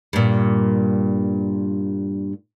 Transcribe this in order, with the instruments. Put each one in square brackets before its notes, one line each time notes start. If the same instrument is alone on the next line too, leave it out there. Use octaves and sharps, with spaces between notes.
[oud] G2 A#2